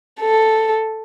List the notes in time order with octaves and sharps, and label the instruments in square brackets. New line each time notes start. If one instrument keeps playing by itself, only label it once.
[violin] A4